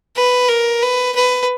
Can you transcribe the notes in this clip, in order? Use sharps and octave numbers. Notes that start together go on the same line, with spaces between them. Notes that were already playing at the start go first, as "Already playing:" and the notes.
B4
A#4
B4
B4